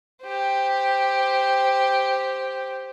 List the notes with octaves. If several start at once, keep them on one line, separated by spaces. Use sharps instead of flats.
G4 C5